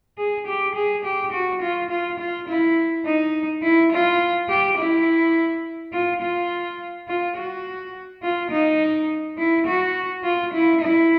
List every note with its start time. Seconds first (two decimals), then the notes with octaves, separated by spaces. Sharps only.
0.18 G#4
0.47 G4
0.75 G#4
1.05 G4
1.33 F#4
1.62 F4
1.90 F4
2.19 F4
2.48 E4
3.06 D#4
3.63 E4
3.92 F4
4.49 G4
4.78 E4
5.93 F4
6.22 F4
7.08 F4
7.37 F#4
8.22 F4
8.51 D#4
9.38 E4
9.67 F#4
10.24 F4
10.54 E4
10.81 E4